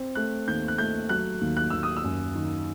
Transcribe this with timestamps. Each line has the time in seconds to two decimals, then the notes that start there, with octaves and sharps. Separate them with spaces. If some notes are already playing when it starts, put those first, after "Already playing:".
Already playing: C4
0.15 A3 F#6
0.48 D#2 G6
0.68 F#6
0.78 A3 G6
1.09 F#3 F#6
1.41 D#2
1.57 F#6
1.70 D#2 E6
1.83 D#6
1.97 E6
2.04 F#2
2.35 D#3